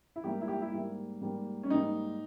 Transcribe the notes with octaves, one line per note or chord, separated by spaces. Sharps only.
E4
G#2 G3 A#3 G4
E4
G4
E4
G#2 G3 A#3
G#2 G3 A#3
C#4
G#2 G3 A#3 D#4